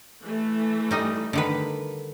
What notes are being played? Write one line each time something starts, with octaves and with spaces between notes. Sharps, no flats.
E3 A3
G3 D#4 D#5
D3 D#3 B4